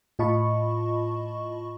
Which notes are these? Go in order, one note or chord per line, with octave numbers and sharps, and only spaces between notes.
A2 F4 D#5 A5 B5 C#6